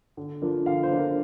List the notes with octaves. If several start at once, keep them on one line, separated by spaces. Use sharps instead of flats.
D3
F3 A#3 D4
D3 F5
C5
F3 A#3 D4
A#4